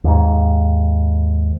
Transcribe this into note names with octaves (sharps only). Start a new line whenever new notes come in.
D#2 G#2